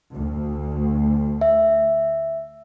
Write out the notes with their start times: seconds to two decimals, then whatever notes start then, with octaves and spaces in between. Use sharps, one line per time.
0.13 D2
1.41 E5